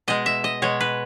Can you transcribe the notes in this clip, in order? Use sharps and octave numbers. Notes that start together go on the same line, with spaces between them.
B2 G#3 D#5
E5
D#5
B2 G#3 C#5
B4